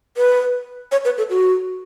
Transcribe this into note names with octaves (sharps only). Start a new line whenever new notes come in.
B4
C#5
B4
A4
F#4